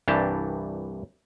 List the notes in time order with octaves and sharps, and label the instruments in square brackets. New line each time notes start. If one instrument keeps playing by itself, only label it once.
[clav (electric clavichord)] C2 G2 E3 D4 G4 A5